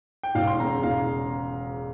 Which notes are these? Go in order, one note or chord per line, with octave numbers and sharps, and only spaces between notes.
G5
E1 F5
C6
E2 C#3 A#5
E1 F5